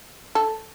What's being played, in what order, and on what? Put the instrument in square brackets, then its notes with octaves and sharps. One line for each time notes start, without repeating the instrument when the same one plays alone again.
[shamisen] A4